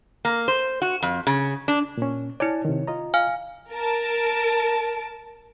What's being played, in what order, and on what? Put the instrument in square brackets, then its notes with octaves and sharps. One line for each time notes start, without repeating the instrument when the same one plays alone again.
[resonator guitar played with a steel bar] A#3
C5
F#4
F2
C#3
D4
[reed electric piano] A#2 C#4
[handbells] E4 C#5 [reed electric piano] D5 G#5 A5
[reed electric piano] C3 D#3
F4 D#5 A#5
[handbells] F5 G#5 F6
[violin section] A#4 A5 D7